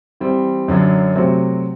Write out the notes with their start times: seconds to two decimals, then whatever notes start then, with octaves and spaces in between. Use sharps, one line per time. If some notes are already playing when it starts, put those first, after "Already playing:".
0.21 E3 G3 C4
0.68 F#2 D3 F#3
1.15 C3 F#3 A3 C4 F#4